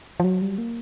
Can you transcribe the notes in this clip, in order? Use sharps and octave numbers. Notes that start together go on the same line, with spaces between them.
F3
F#3
G3
A#3